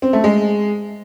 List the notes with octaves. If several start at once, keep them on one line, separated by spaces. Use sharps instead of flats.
C4
A3
G#3